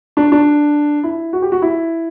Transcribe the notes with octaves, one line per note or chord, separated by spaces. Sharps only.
D4
D4
E4
F#4
G4
F#4
E4